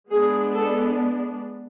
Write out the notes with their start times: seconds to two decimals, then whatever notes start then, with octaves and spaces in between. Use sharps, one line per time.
0.11 G#3 B3 D4 G#4
0.55 A4